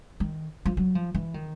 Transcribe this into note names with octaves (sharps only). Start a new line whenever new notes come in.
D#3
F3
F#3
F3
E3
D#3